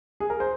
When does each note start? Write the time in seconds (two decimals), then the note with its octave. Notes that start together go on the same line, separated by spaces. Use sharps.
0.20 G#4
0.30 A#4
0.40 C5